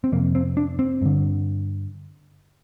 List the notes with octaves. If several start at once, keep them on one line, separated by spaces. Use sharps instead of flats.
C4
F2 C3 A#3
C4
D4
C4
G2 D3